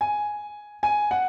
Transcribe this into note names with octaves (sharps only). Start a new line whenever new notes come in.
G#5
G#5
F#5